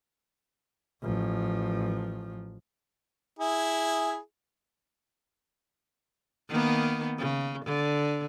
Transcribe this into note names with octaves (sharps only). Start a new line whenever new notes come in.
A1 F3
E4 G#4
D#3 A#3 B3
C#3
D3